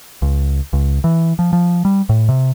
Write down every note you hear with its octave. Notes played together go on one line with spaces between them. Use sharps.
C#2
C#2
E3
F3
F3
G3
A2
C3